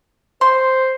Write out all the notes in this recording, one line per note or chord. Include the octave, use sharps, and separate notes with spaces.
C5 C6